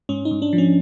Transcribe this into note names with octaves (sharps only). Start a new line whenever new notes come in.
G#2 C#4
D#4
G#2
D4
F3
C#4